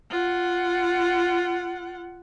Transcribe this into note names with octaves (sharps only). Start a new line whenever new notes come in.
F4 F#5